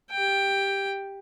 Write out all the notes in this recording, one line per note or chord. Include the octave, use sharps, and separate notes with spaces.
G4 G5